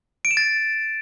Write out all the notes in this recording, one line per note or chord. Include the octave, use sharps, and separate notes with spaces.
D7
E7
A6